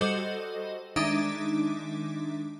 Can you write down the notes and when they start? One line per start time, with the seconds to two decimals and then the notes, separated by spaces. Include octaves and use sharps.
0.01 G3 F#4 A4 C5 D#5
0.96 D#3 G#3 D4 D#4 E5 D6